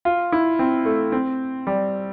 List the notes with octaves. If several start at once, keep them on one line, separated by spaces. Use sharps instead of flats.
F4
E4
C4
A3
C4
G3